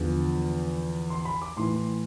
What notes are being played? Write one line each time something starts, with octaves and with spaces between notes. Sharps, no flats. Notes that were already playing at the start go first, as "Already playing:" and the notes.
Already playing: E2 D3 F3
C6
B5
D6
A2 E3 C6